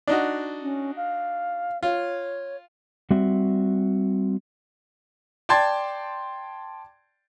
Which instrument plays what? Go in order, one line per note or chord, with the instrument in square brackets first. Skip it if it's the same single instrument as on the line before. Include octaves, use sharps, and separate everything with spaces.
[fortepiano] D4 D#4 F#4
[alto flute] C#4
F5
[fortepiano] F4 [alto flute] C#5
[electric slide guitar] G3 C4 F#4 E5
[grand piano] D5 G5 A5 C6 G#6 A6